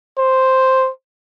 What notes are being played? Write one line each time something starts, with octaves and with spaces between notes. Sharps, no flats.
C5